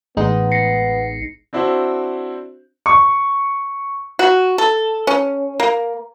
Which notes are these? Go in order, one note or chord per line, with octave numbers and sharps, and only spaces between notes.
A1 G#3 B3 D#4
A#6 C7 C#7
C4 D4 E4 F#4 C5
C#6
F#4
A4
C#4
A#3